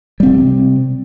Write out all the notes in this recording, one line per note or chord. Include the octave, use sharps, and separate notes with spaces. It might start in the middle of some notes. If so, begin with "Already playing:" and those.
C3 G3 C4